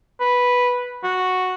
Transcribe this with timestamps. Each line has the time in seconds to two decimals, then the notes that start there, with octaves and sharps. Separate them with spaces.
0.20 B4
1.04 F#4